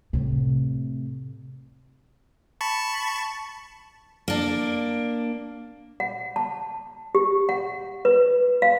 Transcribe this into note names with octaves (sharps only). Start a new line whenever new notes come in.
A2 C3
A5 B5 C#6
A#3 D4
F#5
A5
G4
F#5
B4
F5